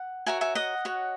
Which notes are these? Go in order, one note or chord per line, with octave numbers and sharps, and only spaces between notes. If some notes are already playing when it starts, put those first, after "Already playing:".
Already playing: F#5
F#4 A#4 C#5 E5 G#5
E5 G#5
D#5 F#5
F#4 C#5